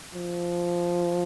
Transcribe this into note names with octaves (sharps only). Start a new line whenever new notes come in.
F3